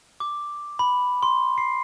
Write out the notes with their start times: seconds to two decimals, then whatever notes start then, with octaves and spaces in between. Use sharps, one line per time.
0.20 D6
0.79 B5
1.23 C6
1.58 C7